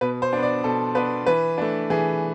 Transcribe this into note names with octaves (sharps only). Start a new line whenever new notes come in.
B2 B4
C5
B3 D4
D5
B2 A4
B3 D4 B4
E3 B4
A3 D4
E3 G#4